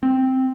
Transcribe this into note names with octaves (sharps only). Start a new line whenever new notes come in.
C4